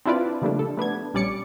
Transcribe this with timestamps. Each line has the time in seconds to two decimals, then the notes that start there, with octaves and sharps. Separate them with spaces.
0.06 C4 D4 E4 F4 B4 D5
0.42 C#3 F3 G3 A3 A#3 D4
0.59 A4
0.77 A3 B3 D4 G#6
1.14 A#1 G3 C#4 D5 D6 C#7